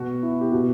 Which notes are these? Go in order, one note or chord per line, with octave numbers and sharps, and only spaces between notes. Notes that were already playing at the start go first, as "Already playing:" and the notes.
Already playing: B2 F#4
E4
G4
B2 F#4